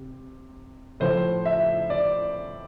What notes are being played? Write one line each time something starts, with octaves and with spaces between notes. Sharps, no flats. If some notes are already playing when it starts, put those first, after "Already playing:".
Already playing: C3
A2 F3 C5
E5
D5